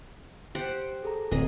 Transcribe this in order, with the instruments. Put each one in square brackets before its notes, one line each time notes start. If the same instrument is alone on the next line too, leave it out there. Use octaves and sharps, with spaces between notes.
[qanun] G4 C5 F#5 [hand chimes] C6
[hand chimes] G#4 A4 A#5
[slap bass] D1 [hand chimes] C4 [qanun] G#4 D#5